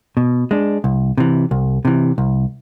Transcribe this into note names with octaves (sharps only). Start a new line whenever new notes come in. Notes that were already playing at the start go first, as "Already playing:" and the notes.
B2
G#3 D4
C2
C3 E3
C2
C3 E3
C2